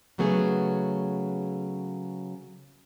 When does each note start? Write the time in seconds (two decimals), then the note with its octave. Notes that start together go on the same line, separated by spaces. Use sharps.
0.18 C#3 F#3 A3 B3 G#4